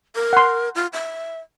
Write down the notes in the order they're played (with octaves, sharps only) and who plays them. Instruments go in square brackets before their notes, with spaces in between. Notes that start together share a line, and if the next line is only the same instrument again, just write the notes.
[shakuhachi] A#4
[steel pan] F#5 C6
[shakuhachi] F4
E5